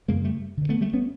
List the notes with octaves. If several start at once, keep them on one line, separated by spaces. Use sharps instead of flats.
F#2 C#3 G#3 A#3
G3 A3
G2 D3
A3 B3
G3 A3
B3 C#4